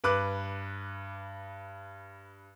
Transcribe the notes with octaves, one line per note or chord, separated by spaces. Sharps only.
G2 B4 D6 F#6